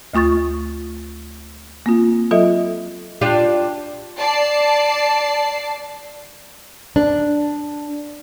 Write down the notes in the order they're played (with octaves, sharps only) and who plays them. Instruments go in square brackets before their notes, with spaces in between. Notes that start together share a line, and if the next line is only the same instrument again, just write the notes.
[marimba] D2 A3 F4 C#6 A6
A#3 C4 F4
F#3 F4 A4 D#5 E5
[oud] D4 F4 G4
[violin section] D5 A5 C7
[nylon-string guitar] D4